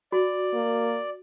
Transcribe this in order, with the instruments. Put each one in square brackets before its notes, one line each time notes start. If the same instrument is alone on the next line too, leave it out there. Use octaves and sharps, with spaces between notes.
[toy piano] F#4 [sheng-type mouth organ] D5
[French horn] A#3